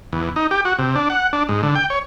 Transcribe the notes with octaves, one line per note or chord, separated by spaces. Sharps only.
E2
D#4
G4
F#4
C3
D4
F#5
D4
G#2
D3
G5
C#5